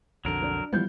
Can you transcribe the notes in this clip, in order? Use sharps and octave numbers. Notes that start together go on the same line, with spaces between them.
B1 F2 D3 F#3 A#4
D4
E3 F3 G3 B3 G6